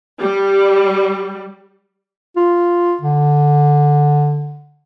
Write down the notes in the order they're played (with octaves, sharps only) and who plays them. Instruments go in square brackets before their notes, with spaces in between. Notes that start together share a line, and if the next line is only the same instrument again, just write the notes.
[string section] G3
[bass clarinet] F4
D3